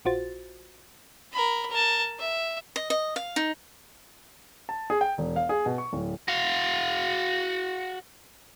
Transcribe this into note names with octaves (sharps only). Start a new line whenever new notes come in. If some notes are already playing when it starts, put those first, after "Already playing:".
A#1 F4 F#4 C5 A6
A#4 B5
A#4 A5
E5
D#5
D#5
F5
D#4
A5
G#4
G5
E1
F5
G#4
B2
C#6
D1
F#4 F5